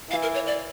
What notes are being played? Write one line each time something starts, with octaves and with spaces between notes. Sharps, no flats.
E3 F5
A#4
C#5
D5